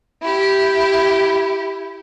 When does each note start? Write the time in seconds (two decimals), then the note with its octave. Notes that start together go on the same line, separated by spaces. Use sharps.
0.22 E4 G4